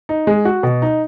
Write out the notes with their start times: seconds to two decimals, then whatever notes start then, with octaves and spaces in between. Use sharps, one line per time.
0.09 D#4
0.27 G#3
0.45 F#4
0.63 B2
0.82 D#4